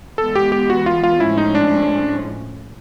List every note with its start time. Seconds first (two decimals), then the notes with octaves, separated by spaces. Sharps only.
0.18 E3 G#3 B3 A4
0.35 G4
0.52 G4
0.70 F#4
0.86 F4
1.03 F4
1.20 A2 F3 G#3 C#4 E4
1.37 D#4
1.55 D4